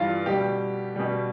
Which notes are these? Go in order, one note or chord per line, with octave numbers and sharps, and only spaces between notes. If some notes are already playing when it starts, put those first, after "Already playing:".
Already playing: G2 E3 G3 F4
B2 G3 G4
B2 G3